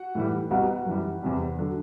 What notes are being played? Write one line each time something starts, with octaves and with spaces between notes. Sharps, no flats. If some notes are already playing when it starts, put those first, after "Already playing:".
Already playing: F#4 F#5
A2 E3 G3
C2 B2 G3 F#4 F#5
F#2 E3 G3
E2 C3 G3
D3 F#3